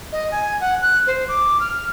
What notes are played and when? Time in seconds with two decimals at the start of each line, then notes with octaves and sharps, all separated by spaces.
0.12 D#5
0.32 G#5
0.61 F#5
0.82 F#6
1.07 C5
1.28 D6
1.60 F6